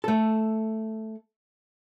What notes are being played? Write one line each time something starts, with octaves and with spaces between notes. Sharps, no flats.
A3 A4